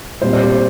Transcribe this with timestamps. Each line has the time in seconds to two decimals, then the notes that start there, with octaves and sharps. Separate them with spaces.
0.22 A#2 G3 C4 C5
0.33 D5
0.44 G4 C5